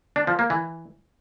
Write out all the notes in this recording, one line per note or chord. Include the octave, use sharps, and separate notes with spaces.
D4
F3
A#3
E3